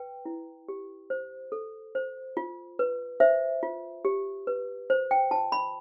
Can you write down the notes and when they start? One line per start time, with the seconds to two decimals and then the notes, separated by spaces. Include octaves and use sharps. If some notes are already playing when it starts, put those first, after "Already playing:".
Already playing: B4 G5
0.26 E4
0.68 G4
1.10 C5
1.52 A4
1.95 C5
2.37 F4
2.79 B4
3.20 C5 E5
3.63 F4
4.05 G4
4.47 B4
4.90 C5
5.11 G5
5.31 F4 A5
5.52 B5